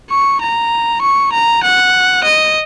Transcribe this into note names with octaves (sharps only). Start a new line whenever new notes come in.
C#6
A#5
C#6
A#5
F#5
D#5